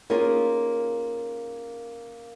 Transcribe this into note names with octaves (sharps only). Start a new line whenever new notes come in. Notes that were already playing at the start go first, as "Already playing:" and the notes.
A#3 C#4 D#4 F4 G#4 A#4